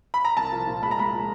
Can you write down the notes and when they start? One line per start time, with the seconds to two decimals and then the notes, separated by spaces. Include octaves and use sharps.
0.14 B5
0.25 A#5
0.37 C2 A5
0.52 F3
0.67 A#2
0.82 G#3 B5
0.91 A#5
0.98 G#3 B5
1.13 F3